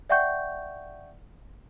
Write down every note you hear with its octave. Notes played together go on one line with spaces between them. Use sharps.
D5 E5 F#5 G5 C#6 G6